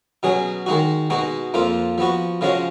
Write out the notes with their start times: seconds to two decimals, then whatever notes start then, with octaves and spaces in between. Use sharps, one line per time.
0.23 B2 F#3 C#4 G#4
0.66 D#3 G#3 D#4 F#4
1.10 B2 G#3 D#4 F#4
1.54 F2 F3 A#3 F4
1.98 F3 B3 F#4
2.41 C#3 F3 G#3 C#4 F#4